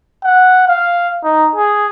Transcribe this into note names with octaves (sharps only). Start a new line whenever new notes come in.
F#5
F5
D#4
G#4